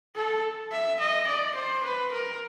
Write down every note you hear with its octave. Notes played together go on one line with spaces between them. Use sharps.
A4
E5
D#5
D5
C5
B4
A#4